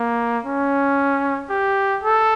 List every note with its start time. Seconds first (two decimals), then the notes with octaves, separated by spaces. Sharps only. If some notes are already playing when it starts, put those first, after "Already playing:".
Already playing: A#3
0.44 C#4
1.50 G4
2.04 A4